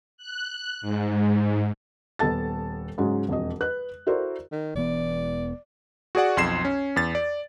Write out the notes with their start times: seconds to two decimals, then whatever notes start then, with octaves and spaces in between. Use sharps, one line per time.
0.17 F#6
0.81 G#2
2.19 D#1 B3 A4 A5 A6
2.98 G#2 C#3 F#3 G#3
3.29 E1 F2 D#5
3.61 B4 F#6
4.07 E4 F#4 A4 A#4 C5 D5
4.52 D#3
4.75 E1 E2 B3 D5
6.15 F#4 G#4 D5 F#5
6.37 B1 F2 C6 G#6 C7 E7
6.65 C#4
6.96 E2 A6
7.15 D5